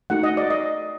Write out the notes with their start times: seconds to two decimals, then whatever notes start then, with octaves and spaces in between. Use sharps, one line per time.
0.10 A3 D#4 F#4 F#5
0.23 D#5
0.37 D5
0.50 D#5